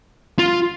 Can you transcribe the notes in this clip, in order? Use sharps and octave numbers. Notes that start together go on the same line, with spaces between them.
F4